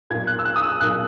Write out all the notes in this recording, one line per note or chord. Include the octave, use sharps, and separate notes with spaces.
B1 A#2 A#3 G#6
F#6
E6
F#6
D#6
E6
B1 A#2 A#3 F#6